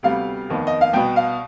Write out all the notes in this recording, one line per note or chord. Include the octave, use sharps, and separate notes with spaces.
D2 C3 G3 B3 F5
F1 D#2 D#3 B3
D#5
F5
C2 B2 B3 G5
F5